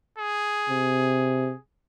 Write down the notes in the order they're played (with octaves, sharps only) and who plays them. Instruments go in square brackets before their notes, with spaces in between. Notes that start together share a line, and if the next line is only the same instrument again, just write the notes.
[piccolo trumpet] G#4
[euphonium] C3